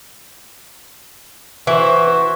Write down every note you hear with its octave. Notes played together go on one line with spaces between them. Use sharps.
E3 F#4 C5 E5